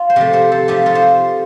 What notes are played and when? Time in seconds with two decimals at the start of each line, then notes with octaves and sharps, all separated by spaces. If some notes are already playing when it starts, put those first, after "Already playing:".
Already playing: F4
0.10 C5
0.16 C3 F3 A3 G4 A#4
0.33 A4 C5
0.52 A4 C5
0.68 C3 F3 A3 D#4 G4
0.86 F4 A4
0.95 C5